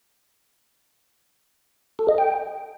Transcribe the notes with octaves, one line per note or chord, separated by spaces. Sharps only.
A4
D#5
G5